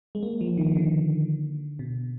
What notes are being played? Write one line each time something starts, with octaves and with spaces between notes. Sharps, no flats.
G#3
A#3
F3
D#3
D#3
D3
B2